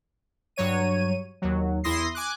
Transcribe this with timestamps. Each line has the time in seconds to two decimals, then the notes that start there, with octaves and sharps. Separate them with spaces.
0.56 G2 F#3 C#5 D#7
1.42 D#2 F#3
1.84 E2 E4 C6 D#6 A#6 C7
2.15 G#5 D6 F#6